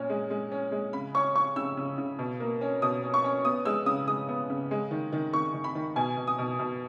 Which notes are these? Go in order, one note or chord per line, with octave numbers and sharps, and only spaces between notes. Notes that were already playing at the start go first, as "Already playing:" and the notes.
Already playing: A#2 C#4
G#3
G#3
C#4
G#3
C#3 B5
C#4 C#6
C#4 C#6
C#3 E6
C#3
C#3
B2
A#3
C#4
B2 D#6
C#4
C#6
C#4
B3 D#6
G#3 E6
C#3 D#6
G#3 D#6
B3
C#3
G#3
D#3
D#3
D#3 C#6
D#3
B5
D#3
B2 G#5
B2
D#6
B2
B2